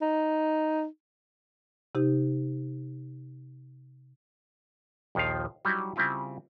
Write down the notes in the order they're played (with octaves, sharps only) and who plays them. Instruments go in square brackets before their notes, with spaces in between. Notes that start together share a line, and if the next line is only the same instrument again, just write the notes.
[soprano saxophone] D#4
[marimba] C3 D#4 G4
[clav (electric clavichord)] A#1 D#2 D#3 F3 F5
F#3 G3 D#4 E4 F#4
C#3 G3 C4 E4 F4